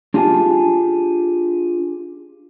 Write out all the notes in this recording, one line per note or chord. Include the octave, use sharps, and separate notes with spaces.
D4 F4 G4 G#4 F5 A5